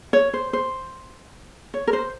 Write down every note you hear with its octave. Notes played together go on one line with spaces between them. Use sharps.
C#5
C5
C5
C#5
A#4
C5